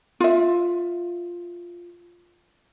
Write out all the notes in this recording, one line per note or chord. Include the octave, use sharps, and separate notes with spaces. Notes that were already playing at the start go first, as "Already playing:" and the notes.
F4 E5